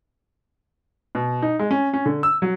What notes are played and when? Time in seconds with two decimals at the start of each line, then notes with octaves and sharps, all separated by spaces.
1.15 B2
1.42 D#4
1.59 G#3
1.71 C#4
1.94 C#4
2.06 D3
2.23 E6
2.42 F#3